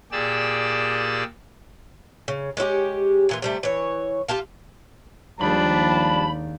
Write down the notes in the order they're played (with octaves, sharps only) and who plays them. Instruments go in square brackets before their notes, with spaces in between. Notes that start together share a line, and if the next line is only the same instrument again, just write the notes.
[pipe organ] A#2 G4 G#4 D5 E6
[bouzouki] C#3
G#3 C#4 E4 G4
A#2 E3 F4
C3 G3 A3
E3 C#5
F4 G4 A4 F5
[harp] D#2 G#3 A#3 [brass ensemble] F3 G3 A5 [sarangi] D4 [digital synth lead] B5